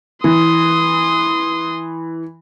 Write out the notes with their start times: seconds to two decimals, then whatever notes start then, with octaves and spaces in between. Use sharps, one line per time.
0.24 E3 C6 D#6